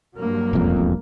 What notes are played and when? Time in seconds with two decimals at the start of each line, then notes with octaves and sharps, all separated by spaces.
0.15 G2 F#3 A#3
0.53 E1 B1 F2